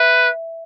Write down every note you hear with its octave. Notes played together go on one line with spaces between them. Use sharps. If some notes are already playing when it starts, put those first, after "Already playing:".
Already playing: B4 E5